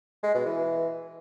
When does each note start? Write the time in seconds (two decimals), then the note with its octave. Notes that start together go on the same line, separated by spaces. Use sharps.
0.23 G#3
0.34 B2
0.45 E3